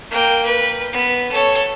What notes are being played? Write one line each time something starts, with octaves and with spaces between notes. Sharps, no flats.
A#3 G5
B4
B3 B5
A4 C#5